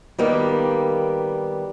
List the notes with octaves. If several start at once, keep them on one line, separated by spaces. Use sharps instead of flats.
D#3 G3 A#3 B3